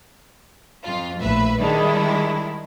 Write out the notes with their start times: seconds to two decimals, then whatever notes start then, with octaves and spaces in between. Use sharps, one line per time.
0.83 F2 F4
1.20 A#1 A2 B4 E5
1.60 D#3 G3 G#3 D4 E4